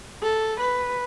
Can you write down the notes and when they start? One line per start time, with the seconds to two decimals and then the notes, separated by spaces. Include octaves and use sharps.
0.23 A4
0.61 B4